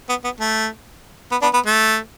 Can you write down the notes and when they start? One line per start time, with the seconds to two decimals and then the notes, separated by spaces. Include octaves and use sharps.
0.09 B3
0.24 B3
0.40 A3
1.31 B3
1.42 B3 D4
1.54 B3
1.66 A3